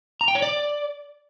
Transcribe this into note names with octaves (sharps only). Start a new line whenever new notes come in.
A#5
G5
C#5
D5